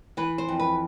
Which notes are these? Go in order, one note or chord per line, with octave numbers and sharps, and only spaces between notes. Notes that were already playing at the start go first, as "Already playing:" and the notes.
E3 B4
C5
F2
B4